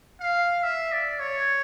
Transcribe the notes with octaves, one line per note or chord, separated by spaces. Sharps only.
F5
E5
D5
C#5